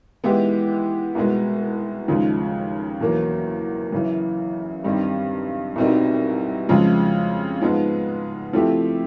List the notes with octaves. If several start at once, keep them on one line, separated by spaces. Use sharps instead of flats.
E3 G#3 B3 E4 G4
C2 B2 G#3 B3
D#2 C#3 F3 G#3
E2 B2 F#3 A#3 C#4
F#2 C#3 E3
G2 D#3 G3 C4 D#4
C2 B2 G3 C4 D#4
F2 C#3 F3 G#3
G#2 F3 G#3 B3
F3 A3 C4 E4 G4